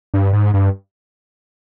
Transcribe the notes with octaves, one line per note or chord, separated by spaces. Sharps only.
G2
G#2
G2